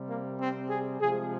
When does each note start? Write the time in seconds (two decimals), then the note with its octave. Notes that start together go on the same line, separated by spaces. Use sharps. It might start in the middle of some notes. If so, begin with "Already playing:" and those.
Already playing: C3 G3
0.08 A#3
0.39 C4
0.69 G#4
1.00 C3 F3 G#3 G#4